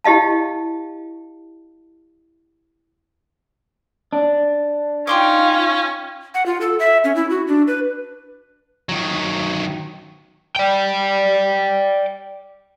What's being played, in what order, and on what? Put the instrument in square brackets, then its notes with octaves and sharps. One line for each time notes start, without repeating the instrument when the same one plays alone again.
[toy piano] E4 G4 D#5 F5 A5
[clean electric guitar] D4
[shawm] C#4 [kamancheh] D#4 F4 [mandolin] G5 C6 D6
[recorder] F#5
F4
A4
E5
C#4
E4
F#4
D4
B4
[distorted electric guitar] D#3 F#3
[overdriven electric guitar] D5 G5